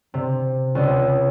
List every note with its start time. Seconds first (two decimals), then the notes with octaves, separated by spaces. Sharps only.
0.14 C3
0.75 C#2